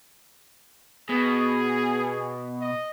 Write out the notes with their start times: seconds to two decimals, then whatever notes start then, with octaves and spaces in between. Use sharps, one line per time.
1.10 B2 G#4
2.61 D#5